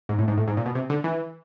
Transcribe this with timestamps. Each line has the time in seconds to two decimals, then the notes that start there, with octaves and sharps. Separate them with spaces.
0.09 G#2
0.19 A2
0.28 G#2
0.37 A2
0.48 G#2
0.57 A#2
0.66 B2
0.75 C3
0.90 D3
1.04 E3